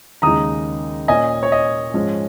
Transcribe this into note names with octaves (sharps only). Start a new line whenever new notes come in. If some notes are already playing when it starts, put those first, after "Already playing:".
D#2 C#3 G#3 D#4 A#5 D#6
A#2 A#3 C#4 D#5 G#5
C#5
D#5
G#2 F3 G#3 C#4